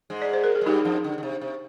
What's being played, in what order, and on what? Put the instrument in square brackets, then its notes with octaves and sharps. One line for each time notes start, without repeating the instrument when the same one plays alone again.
[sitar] G#2 G#3
[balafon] D5
C5
A#4
G#4
[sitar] G#3
[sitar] G2 G3 [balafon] D#4 G4
[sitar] F2 F3
D3
D3
C3
C3